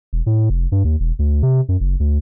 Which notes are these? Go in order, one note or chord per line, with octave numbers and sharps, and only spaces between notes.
E1
A2
F1
G2
D#2
E1
D2
C3
F#2
F#1
D2